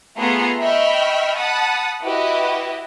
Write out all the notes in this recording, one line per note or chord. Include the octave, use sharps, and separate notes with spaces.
A3 B3 F4 G#4 A#5 C6
D#5 E5 G5 B5 C#6 F6
F#5 A5 B5 D#6
E4 F#4 G4 B4 D#5